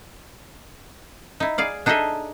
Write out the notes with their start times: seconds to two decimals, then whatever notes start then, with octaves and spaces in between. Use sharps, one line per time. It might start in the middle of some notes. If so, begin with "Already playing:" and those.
1.40 D#4 E4
1.58 G#4 D5 F5
1.86 D4 D#4 G#4 A4 D#5 E5